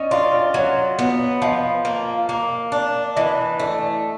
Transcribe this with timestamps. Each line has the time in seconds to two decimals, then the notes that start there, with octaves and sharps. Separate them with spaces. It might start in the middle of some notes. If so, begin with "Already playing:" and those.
Already playing: C#4 D5 D#5
0.11 F4 D5
0.33 D5
0.54 F#3 D5
0.99 B3 C#5
1.42 F3 D#5
1.85 A#3
2.29 A#3
2.72 D4
3.16 E3 D#5
3.59 A3 D5